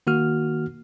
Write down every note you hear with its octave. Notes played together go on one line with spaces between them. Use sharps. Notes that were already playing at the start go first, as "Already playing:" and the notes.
D#3 A#3 F#4 F6